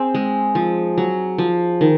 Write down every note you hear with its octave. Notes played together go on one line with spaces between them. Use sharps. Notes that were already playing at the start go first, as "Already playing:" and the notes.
Already playing: C4 G#4
G#3
F3
F#3
F3
D#3